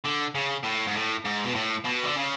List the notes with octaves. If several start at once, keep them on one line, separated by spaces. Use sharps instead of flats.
D3
C#3
A2
G#2
A2
G#2
B2
A2
B2
D3
C#3